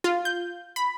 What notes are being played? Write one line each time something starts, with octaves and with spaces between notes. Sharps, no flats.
F4
G6
B5